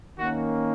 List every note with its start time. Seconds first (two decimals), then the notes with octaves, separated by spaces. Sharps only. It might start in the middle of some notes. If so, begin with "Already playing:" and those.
0.18 D#3 A#3 C#4 F#4